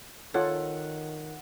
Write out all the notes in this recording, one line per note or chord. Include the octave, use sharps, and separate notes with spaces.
D#3 F4 A4 C#5 F#5